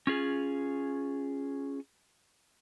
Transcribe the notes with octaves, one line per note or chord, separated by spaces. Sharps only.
C#4 F4 G#4